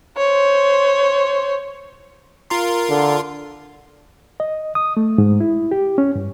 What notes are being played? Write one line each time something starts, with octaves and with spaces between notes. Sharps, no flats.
C5 C#5
F4 A#4 C6
D3
D#5
D#6
A3
G#2
E4
G4
C#4
G2